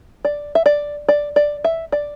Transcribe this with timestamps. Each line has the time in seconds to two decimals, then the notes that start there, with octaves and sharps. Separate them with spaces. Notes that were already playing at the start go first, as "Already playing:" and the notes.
0.25 D5
0.55 E5
0.66 D5
1.09 D5
1.36 D5
1.64 E5
1.92 D5